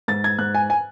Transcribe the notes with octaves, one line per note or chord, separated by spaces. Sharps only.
G#2 A6
G#6
G#2 F#6
G#5
G#5